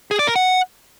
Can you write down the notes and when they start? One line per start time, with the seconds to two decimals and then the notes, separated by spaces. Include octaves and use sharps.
0.11 G#4
0.19 D5
0.27 A#4
0.36 F#5